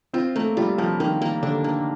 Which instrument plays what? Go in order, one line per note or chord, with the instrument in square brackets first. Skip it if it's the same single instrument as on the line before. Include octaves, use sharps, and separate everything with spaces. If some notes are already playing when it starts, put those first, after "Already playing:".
[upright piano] C4 [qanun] F4
[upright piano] A3 [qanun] A#3
[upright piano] G3 [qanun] F4
[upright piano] F3 [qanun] A#3
[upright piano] D#3 [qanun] A#3
[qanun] A#3
[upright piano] D3 [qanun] D4
[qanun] A#3